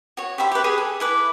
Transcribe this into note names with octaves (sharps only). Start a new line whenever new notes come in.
F#4 C#5
G4 C5 E5 B5
G4 B4
G4 G#4 B5
A4
E4 B4 D6